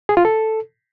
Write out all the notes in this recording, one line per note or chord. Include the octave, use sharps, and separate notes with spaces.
G#4
F4
A4